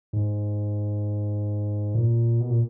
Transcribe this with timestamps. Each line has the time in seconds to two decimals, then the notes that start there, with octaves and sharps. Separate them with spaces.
0.13 G#2
1.95 A#2
2.40 B2
2.50 A#2